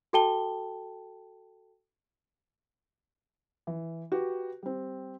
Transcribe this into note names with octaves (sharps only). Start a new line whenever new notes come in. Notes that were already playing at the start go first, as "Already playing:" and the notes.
F#4 A4 G5 A5 G7
E3
F#4 G4 B4
G3 C4